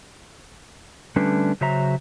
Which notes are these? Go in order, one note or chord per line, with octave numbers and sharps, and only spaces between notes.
D3 G3 A3 C#4 D4 B4
C#3 F#3 C5 E5 A#5